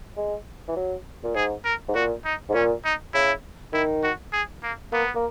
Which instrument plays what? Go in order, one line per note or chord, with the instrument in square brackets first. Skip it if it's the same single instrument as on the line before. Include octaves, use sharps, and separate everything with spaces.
[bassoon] G#3
E3
F#3
A#2
[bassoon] G#2 [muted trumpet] G#4
[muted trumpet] A#4
[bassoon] G#2
[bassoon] A#2 [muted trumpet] F#4
[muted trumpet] D#4
[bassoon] G#2
[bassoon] A#2 [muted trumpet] C#4
[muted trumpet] D#4
[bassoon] C#3 [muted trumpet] E4
[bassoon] D#3 [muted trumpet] E4
[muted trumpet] F#4
G#4
A#3
[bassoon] A#3 [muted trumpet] B3
[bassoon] A#3